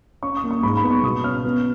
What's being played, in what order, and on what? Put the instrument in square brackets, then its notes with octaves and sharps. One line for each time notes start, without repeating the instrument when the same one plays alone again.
[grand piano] C#4 C#6
D#6
A#3
C#6
G#2 B5
B5
B3
C#6
B2 D#6
C#4 F6
B3